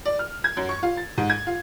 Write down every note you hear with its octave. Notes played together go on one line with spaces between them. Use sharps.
D5
F6
G#6
F#2
C#6
F4
A6
G#2
G#6
F4